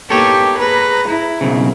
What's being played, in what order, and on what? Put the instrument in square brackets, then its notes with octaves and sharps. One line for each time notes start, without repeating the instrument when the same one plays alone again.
[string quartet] A#3 B3 D#4 [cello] G4 [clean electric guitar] A4 C#5
[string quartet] G#4 A#5 A#6 [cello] B4
[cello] E4
[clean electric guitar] B1 C#3 [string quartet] F#3 C4 A#4